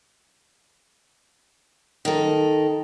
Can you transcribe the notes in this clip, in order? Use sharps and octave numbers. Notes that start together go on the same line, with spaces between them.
D#3 A4